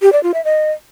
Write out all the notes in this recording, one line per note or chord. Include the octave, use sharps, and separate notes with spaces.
G4
D5
F4
E5
D#5